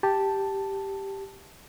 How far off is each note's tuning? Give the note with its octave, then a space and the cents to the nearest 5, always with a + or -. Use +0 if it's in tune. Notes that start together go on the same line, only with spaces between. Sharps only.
G4 +0 A5 +0